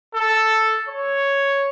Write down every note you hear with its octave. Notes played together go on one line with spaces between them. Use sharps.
A4
C#5